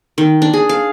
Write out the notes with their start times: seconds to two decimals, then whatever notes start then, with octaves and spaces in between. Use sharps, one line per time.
0.18 D#3
0.42 D4
0.53 G#4
0.69 F5